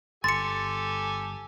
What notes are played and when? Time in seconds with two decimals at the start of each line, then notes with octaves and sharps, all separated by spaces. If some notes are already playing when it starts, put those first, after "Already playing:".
0.24 G1 G4 A4 G#5 C6 A6 C#7